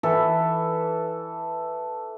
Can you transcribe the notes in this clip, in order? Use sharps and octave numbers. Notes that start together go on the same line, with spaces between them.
E3 A4